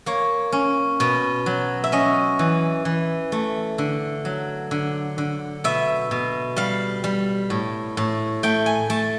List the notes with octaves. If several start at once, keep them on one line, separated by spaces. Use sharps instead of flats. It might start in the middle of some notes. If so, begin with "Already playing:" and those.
A#3 C#5
C#4
B2
F#3
E5
C#4 D#5
E3
E3
A3
D3
F#3
D3
D3
B2 E5
B2
G3 F5
G3
A2
A2
A3 G5
G#5
A3 A5